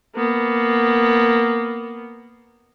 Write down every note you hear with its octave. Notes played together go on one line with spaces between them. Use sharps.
A#3 B3